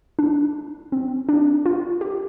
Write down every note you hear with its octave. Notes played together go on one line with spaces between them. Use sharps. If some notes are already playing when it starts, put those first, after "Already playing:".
D4
C4
D4
F4
G4